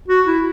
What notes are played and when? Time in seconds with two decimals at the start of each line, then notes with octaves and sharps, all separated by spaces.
0.08 F#4
0.26 E4